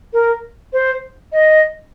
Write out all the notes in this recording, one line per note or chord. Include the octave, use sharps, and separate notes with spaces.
A#4
C5
D#5